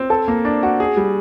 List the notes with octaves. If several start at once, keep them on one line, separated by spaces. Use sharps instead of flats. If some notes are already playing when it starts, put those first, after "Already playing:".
Already playing: C4
A4
A#3
D4
F#4
G#4
G3